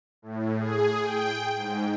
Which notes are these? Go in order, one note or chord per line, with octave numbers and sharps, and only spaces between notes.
A2
G#4
G5
G#2